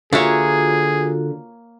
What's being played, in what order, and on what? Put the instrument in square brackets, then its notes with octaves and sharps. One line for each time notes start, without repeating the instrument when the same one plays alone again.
[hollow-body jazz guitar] D3 E5 [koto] A#3 C#5 [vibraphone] F4 F#4 [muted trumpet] G#4